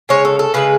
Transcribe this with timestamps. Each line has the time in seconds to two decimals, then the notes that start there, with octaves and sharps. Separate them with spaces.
0.09 C#3 G#3 C#5
0.25 A4
0.39 A4
0.54 C#3 G#3 B4